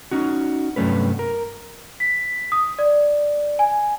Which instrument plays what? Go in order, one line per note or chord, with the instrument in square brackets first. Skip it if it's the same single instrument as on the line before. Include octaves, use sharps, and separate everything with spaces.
[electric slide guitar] C#4 D#4 F#4
G2 C3 F#3 A3 C#4 B4
A#4
[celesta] B6
D#6
D5
G#5